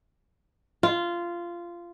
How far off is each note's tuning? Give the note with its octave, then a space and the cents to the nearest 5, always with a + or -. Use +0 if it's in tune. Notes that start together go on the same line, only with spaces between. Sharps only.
F4 -15